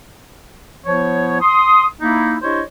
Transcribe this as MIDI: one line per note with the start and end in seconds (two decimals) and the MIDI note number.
0.86 1.37 53
0.86 1.37 59
0.86 1.37 64
0.86 1.37 73
1.41 1.85 84
1.41 1.85 87
2.01 2.37 58
2.01 2.37 63
2.01 2.37 64
2.42 2.62 62
2.42 2.62 64
2.42 2.62 67
2.42 2.62 72
2.42 2.62 73
2.42 2.62 75